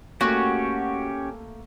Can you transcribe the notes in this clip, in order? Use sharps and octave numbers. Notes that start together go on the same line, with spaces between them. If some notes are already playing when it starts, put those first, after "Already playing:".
A3 A#3 C#4 F#4 G4